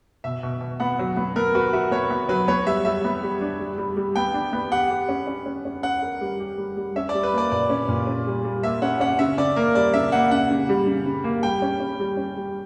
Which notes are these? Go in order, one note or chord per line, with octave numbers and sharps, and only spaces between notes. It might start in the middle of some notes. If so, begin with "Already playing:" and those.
B2 E5
B2
B2
B3 F#5
F#3
B3
B3 A#4
F#4 B4
F#4 E5
B3 C#5
B3
F#3 B4
B3 C#5
G3 E5
G3 E5
B3
G3
D4
G3
G3
G3
B3 G5
D4
B3
G4 F#5
G4
C#4
C#4
C#4
C#4
C#4 F#5
A#4
G3
G4
G3
G3
C#4 E5
D5
G3
B4
A#3 D5
A#2 D5
C#4
A#2
C#4
G3
G3
A#3 E5
C#4 F#5
C#4 F#5
C#3 E5
C#3 D5
A#3 A#4
G3 D5
C#3 E5
A#3 F#5
C#3 F#5
C#3
G3
C#3
C#3
A#3
G3 G5
C#4
C#4
G3
C#4
G3